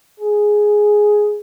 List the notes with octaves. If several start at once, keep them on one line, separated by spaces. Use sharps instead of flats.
G#4